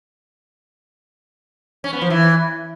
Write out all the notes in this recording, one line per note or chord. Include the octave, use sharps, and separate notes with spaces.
C#4
B3
F3
E3